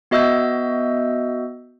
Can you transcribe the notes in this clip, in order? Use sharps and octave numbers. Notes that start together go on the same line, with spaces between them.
B3 F#4 D#5 E5 E6 G6